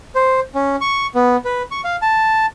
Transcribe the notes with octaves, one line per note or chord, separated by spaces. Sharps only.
C5
C#4
C#6
B3
B4
C#6
F5
A5